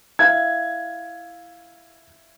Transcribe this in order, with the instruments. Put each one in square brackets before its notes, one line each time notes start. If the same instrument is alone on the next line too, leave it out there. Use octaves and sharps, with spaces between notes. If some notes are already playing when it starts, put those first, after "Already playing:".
[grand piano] E4 F5 [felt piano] G#6